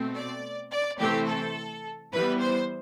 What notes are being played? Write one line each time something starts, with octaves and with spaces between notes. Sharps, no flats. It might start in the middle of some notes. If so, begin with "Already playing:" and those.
Already playing: B2 A3 C4
D5
D5
C3 E3 A3 C4 G4
A4
E3 G3 B3 B4
C5